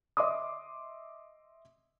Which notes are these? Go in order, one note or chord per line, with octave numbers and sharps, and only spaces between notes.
D#5 E5 C6 D6 D#6